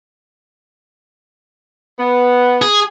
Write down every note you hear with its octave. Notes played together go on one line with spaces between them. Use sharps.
B3
G#4